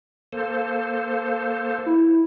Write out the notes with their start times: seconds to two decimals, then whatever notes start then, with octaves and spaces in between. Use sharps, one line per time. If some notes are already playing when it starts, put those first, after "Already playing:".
0.33 A#3 A4 C5
1.86 E4